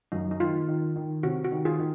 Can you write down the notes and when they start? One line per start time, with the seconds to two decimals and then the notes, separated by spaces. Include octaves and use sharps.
0.12 F#2 D#4
0.31 D#4
0.40 D#3 F4
0.68 D#3
0.96 D#3
1.23 C3 F#4
1.45 F#4
1.52 D#3
1.65 F4 G#4
1.79 D#3